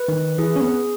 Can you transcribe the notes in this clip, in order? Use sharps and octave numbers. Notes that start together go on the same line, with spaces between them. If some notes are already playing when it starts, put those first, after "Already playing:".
Already playing: B4
D#3
E3 G#4
C#4
B3